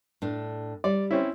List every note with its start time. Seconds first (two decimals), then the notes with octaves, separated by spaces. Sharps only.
0.22 A2 D4
0.84 G3 D5
1.11 C4 C#4 E4